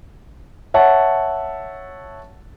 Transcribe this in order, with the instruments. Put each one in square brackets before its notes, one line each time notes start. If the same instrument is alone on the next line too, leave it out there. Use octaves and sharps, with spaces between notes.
[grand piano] C#5 E5 F#5 A5